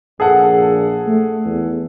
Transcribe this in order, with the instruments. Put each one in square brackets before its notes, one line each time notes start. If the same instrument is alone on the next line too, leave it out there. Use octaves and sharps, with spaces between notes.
[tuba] A#1 [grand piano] G#4 A4 F#5
[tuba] A3
E2